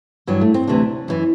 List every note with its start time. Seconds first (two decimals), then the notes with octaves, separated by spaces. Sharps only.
0.27 G2 E3 F#3
0.41 A3
0.54 C4
0.67 D2 C3 E3 D4
1.08 F#2 E3